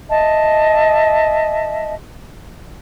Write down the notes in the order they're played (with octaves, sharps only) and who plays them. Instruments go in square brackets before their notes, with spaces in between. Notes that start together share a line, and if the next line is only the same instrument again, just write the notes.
[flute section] D#5 E5 A5